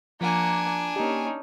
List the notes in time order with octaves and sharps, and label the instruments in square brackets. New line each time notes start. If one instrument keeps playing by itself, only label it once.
[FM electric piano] F3 [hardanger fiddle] A#3 F#5 [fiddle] D4 G#5
[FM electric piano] A#3 G4 [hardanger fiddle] C#4 D#4